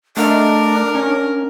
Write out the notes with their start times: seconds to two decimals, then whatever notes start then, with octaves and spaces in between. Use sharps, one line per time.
0.17 A3 D4 A#4 D#5 F5 F#5
0.95 C#4